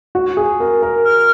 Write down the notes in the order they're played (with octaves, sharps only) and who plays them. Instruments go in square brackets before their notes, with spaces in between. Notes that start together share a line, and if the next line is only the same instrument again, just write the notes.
[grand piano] F#4
G#4
A#4
A#4
[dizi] F6